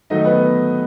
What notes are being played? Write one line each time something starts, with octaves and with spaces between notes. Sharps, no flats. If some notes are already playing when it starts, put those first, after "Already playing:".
D#3 F#3 A3 D#4 D#5
B3 B4